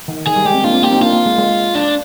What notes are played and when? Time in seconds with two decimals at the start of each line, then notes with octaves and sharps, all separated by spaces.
0.08 D#3
0.27 D#3 G#4
0.36 G3
0.45 G#3 G4
0.54 C4
0.64 A#3 D4 F4
0.73 C4
0.82 A#3 D4 G4
0.91 C4 D#4
1.01 A#3 D4 F4
1.13 A#3
1.26 G#3
1.38 G#3
1.75 D4